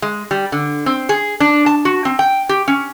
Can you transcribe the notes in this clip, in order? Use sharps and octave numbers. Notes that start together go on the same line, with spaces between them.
G#3
G3
D3
C4
G#4
D4
A5
F#4
C4
G5
G4
C#4